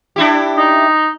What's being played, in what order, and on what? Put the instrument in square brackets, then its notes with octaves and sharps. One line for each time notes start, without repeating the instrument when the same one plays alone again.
[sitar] D4 E4 G4
[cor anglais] D#4